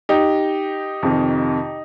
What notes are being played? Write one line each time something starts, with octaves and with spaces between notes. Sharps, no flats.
D#4 G4
F2 C3 D#3